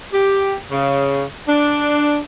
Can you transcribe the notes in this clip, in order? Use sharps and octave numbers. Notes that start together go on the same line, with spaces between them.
G4
C#3
D4